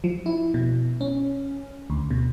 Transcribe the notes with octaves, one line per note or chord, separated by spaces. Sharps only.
F3
E4
B2
C#4
D2
B2